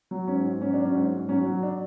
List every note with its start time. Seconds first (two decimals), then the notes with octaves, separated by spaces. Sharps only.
0.11 F#3
0.27 G#2 C#4
0.45 G#2
0.61 F#3 C#4
0.73 F#3 D4
0.85 C#4
0.95 G#2
1.12 G#2
1.29 F#3 C#4
1.45 F#3
1.63 D4